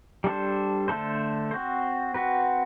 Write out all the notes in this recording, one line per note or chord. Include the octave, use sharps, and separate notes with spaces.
G3 D4 A4 C5
D3 A3 D4 A4 C5
C4 F#4 C5
C4 F#4 B4